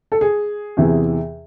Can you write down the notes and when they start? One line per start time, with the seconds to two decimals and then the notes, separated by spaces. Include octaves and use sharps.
0.12 A4
0.21 G#4
0.77 E2 C3 E3